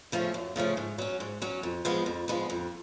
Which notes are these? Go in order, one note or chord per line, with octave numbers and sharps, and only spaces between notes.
C#3 F3 A3 C#4
F#2
C#3 F3 A3 C#4
G#2
F#3 C#4
G#2
F#3 C#4
F2
F3 G#3 B3
F2
F3 G#3 B3
F2